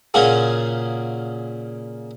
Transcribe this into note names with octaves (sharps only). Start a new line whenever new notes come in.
A#2 C#3 C#4 F4 F#4 G#4